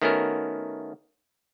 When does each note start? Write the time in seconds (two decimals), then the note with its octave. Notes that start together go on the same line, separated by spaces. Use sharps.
0.02 D#3 A3 B3 C#4 F#4 A#4